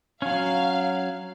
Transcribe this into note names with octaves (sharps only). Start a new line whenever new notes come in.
F#3 C#4 F5